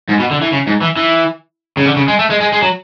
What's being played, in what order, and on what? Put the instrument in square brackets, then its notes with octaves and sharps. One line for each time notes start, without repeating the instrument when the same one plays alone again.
[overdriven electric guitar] G#2
B2
D3
E3
C#3
G#2
E3
E3
C#3
D3
C#3
G#3
A3
G#3
G#3
G#3
F#3